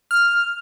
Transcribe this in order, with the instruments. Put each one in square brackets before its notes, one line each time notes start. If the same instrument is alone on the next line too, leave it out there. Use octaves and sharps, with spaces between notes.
[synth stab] F6